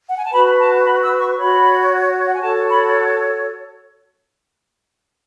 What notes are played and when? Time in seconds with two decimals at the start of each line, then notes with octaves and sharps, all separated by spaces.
0.08 F#5
0.16 G#5
0.25 A5
0.31 F#4 B4 B5
0.58 A5
0.84 B5
1.02 E6
1.18 C#6
1.36 F#4 C#5 B5
2.26 F#5
2.34 G#5
2.41 F#4 A4 C#5 A5
2.68 B5